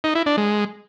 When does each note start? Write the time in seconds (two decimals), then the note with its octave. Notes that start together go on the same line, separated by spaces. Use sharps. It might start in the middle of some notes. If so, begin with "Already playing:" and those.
0.04 D#4
0.15 E4
0.26 D4
0.37 G#3